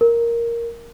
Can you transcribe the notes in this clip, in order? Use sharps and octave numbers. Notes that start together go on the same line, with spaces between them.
A#4